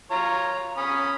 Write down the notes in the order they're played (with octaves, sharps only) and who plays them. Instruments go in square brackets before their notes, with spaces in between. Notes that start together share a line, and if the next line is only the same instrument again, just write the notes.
[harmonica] F4 C#5 A#5
C#4 B5 D#6